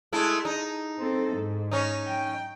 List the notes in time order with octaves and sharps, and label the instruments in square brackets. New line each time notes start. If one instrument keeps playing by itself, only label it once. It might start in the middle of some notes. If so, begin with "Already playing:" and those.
[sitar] G#3 A3 E4
D#4
[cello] C4 A4
G#2
[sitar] C#4 D#4
[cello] G5